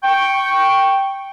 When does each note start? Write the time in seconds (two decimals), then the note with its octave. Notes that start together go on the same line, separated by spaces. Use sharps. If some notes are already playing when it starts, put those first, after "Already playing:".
0.04 G5 C#6